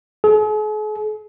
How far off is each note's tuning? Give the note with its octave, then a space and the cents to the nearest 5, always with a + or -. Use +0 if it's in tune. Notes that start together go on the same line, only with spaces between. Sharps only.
G#4 +45